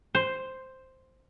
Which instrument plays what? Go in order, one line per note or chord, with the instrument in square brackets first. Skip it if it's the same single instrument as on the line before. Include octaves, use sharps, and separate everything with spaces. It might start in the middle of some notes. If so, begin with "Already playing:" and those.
[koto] C5